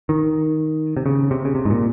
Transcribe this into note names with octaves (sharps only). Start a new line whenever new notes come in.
D#3
C3
C#3
C3
C#3
C3
G#2
A#2